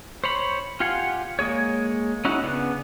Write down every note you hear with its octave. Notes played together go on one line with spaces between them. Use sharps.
C5 C#5 B5
F4 G4 F5 F#5 G#5
G#3 A#3 G#4 C#5
C#4 D#4 E4 F#4
C#3 B3 D4